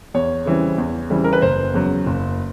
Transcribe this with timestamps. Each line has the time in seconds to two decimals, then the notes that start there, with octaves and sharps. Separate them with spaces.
0.14 E2 C#5
0.46 C#3 E3 G3 C4
0.78 E2
1.10 C#3 E3 G3 C4
1.24 A#4
1.33 B4
1.42 F#1 C5
1.74 E2 C#3 F#3
2.06 F#1